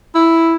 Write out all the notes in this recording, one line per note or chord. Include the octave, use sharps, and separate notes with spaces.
E4